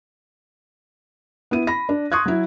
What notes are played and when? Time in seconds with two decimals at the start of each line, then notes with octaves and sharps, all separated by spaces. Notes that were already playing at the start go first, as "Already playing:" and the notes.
1.51 B3 E4 D#7
1.67 B5 A#6
1.89 D4
2.12 C6 C#6 D#6 F#6 G#6
2.26 F#3 E4